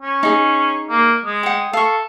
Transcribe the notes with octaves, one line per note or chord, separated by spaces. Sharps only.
C#4
D#4 G#4
A#3
G#3
F#5 G5
A4 F5 C#6